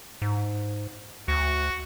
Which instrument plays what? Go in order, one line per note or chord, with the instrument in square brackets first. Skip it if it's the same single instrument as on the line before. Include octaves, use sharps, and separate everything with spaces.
[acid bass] G#2
[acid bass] D2 [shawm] F#4